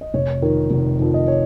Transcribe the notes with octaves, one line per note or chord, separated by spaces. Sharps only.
D#5
F1 C#5
F2 D#3 A#4
F1
F2 D#3
D#5
C#5